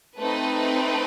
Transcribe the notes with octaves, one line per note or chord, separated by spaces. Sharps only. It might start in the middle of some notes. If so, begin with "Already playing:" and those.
A3 C4 D#4 B4